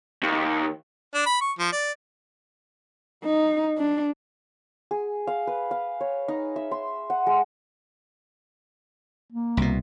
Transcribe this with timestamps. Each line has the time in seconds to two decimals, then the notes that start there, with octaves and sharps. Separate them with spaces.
0.23 D#2
1.14 D4
1.26 B5
1.41 C#6
1.58 F3
1.72 D5
3.25 D#4
3.78 D4
4.91 G#4
5.27 F5
5.47 B4
5.71 F5
6.01 C#5
6.28 D#4
6.56 E5
6.71 C6
7.10 F#5
7.27 G#3
9.32 A#3
9.57 C2 B2